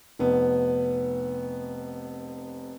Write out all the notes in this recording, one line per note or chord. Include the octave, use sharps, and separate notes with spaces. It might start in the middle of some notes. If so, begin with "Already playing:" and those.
F1 B3